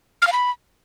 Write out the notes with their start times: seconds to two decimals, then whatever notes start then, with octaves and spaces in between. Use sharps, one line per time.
0.22 F6
0.27 F5
0.33 B5